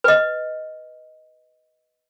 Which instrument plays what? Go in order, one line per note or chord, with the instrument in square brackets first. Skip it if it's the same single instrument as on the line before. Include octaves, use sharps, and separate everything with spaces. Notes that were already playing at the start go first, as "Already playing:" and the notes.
[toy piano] B4 D#5